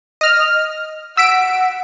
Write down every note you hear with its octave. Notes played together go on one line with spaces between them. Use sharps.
D#5 F6
F#5 E6 B6 D7